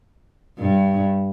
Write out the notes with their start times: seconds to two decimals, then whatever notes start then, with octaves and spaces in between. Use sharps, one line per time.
0.59 G2